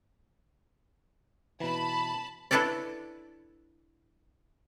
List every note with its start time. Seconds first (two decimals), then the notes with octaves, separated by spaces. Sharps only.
1.60 B2 E3 A5 B5
2.51 D4 E4 A4 B4 C#5 D5